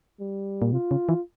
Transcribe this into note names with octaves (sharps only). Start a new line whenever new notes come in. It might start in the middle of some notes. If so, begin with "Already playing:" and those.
G3
A#2
C3 F4
C#3
E3